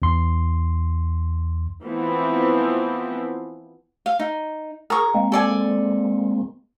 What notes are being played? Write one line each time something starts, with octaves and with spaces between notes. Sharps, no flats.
E2 C6
E3 F3 B3 C4
F5
D#4
G#4 A#4 A#5 C#6
G#3 A#3 C4
A4 D5 G#5